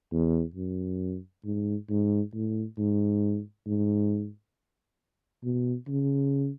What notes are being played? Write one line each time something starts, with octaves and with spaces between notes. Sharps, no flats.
E2
F#2
G#2
G#2
A2
G#2
G#2
B2
C#3